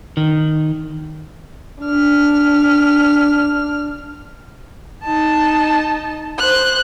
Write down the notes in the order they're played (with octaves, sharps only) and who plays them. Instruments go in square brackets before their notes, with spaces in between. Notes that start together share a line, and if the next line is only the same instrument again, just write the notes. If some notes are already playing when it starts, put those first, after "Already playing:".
[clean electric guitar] D#3
[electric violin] D4 F6
[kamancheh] D#4 A5
C5 F#6